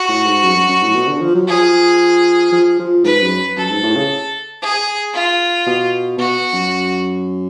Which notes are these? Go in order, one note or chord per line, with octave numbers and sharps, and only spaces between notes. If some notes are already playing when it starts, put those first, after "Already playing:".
Already playing: F#4
A2
G#2
F#2
F#2
F#2
A2
B2
D3
F3
F#3
F3 G#4
F3
F3
G#2 B4
F#2
F#2 A4
G#2
A2
C#3
G#4
F4
B2
B2 F#4
F#2